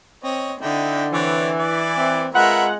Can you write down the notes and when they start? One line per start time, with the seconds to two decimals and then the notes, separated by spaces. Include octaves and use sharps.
0.24 C4 C#5 D#5
0.61 D3 D#4 E4 G5
1.13 E3 C4 C#5 D5
1.59 E4 D5
1.97 C4
2.35 G#3 F4 A#4 B4 E5 F#5